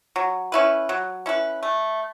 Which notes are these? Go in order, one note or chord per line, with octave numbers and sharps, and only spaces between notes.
F#3
C#4 E4 B4
F#3
C#4 E4 B4
A3